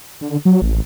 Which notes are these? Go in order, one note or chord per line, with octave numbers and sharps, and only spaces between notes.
D3
F#3
A1